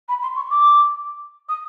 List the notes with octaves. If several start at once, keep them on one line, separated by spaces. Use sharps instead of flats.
B5
C6
C#6
D6
D#6